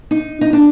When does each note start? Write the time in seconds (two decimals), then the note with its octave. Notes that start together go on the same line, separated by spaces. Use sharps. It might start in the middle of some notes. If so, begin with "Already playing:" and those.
0.11 D#4
0.41 D#4
0.53 D4